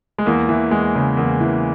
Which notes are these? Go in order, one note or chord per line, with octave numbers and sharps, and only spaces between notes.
G#3
E2 A#3
E3
E2 G#3
C#3
E2 A#3
E3